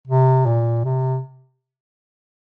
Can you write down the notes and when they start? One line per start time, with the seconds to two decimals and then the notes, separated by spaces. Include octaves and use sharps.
0.07 C3
0.46 A#2
0.85 C3